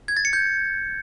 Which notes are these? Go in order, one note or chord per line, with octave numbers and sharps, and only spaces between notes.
G#6
A6
C#7
G6